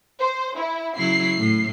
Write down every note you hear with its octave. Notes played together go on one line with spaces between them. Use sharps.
C5
E4
C#3 F#3 E4 C7
A2